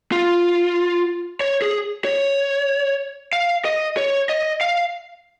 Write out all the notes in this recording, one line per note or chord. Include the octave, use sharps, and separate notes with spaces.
F4
C#5
G#4
C#5
F5
D#5
C#5
D#5
F5